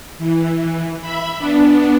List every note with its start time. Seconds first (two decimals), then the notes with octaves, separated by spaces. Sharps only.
0.18 E3
1.01 E5 B5
1.39 B3 D4